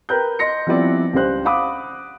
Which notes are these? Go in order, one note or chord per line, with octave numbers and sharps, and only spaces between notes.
A#4 B4 G5 A#5 F#6 G6
D#5 C6 A#6 C#7
F3 G3 B3 C4 E4 D5
C#2 G3 D4 G4 C5 F#6
F5 F#5 B5 D6 D#6